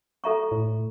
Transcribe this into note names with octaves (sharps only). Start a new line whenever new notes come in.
A4 E5 A#5 C#6
A2